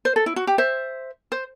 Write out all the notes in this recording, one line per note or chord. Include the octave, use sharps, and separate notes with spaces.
C5
A4
E4
F#4
G4
C5 E5
C5